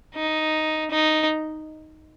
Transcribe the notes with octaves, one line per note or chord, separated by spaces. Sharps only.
D#4
D#4